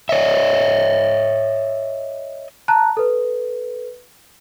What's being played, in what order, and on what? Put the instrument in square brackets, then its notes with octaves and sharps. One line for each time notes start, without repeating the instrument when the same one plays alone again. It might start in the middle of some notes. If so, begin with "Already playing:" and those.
[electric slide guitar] C#5 D#5 E5
[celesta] A5 A#5 F#6
A4 B4